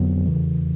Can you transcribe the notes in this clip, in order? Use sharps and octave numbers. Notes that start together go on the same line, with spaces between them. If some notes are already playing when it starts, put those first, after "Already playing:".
Already playing: F2 D3 F#3 B3
E2 C#3 E3